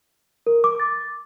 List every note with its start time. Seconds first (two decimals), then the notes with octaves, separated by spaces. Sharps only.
0.47 A#4
0.64 D6
0.80 A6